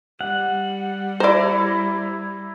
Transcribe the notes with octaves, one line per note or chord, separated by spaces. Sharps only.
G3 F#5
E4 C5 D5 A#5